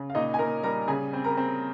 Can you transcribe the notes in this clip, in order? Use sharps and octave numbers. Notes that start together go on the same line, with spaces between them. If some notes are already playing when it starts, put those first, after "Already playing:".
Already playing: C#3
F5
A#2 D#4 D#5
G#5
A#2 A#4 A#5
G3 A#4 A#5
C#3 G#4 G#5
C4
A#4 A#5
C4